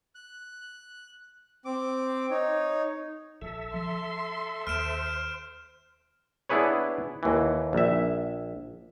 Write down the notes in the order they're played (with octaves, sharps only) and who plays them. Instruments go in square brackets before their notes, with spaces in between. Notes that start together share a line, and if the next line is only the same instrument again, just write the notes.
[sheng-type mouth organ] F#6
C4 D6
D#4 C#5
[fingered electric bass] A#1 [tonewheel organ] A4 E5
[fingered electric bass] F3 [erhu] C6
[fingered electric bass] D#2 [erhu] C5 [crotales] F6 D7 E7
[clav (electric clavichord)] B3 D4 E4 G#4 B4 C#5
D#2 E3
A#1 E5